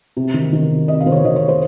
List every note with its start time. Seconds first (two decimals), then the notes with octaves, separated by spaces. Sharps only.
0.17 C3
0.34 D#3
0.53 D#3
0.70 C3
0.88 C3 D#5
1.00 F5
1.06 D#3 C5
1.12 C#5
1.24 D#3 D#5
1.36 C#5
1.48 C5